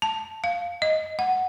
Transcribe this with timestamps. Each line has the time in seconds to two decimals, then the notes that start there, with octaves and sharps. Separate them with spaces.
0.02 A5
0.44 F5
0.82 D#5
1.19 F#5